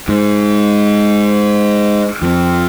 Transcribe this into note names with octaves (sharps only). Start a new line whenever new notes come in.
G#2
F2